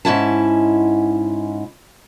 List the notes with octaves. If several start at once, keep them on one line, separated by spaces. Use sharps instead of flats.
G#2 C#4 E4 A5